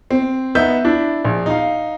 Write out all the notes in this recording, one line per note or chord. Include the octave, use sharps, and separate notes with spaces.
C4
B3 D#4 E5 G6
D4 E4
A#1
D#4 F5